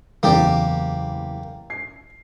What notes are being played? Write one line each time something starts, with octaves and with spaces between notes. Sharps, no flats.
F#1 E2 A#3 G4 D5
C7